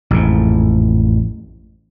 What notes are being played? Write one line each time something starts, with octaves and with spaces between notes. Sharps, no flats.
A1 F2 G#2